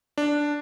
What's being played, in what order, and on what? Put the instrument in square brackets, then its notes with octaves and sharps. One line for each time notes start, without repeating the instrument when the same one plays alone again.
[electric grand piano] D4